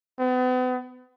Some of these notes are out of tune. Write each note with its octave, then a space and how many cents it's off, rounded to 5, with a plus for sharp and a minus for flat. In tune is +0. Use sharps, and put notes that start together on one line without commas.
B3 +40